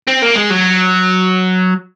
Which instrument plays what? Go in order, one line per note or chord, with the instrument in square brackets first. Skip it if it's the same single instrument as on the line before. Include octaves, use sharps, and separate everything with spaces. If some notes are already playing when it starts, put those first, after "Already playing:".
[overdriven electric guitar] C4
A#3
G#3
F#3